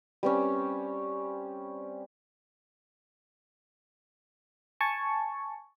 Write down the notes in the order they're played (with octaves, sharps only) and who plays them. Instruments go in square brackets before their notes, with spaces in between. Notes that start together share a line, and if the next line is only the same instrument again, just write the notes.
[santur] G3 C4 C#4
[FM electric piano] G#5 A5 C#6